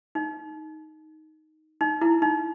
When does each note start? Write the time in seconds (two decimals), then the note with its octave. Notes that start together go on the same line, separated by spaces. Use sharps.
0.15 D#4
1.81 D#4
2.01 E4
2.22 D#4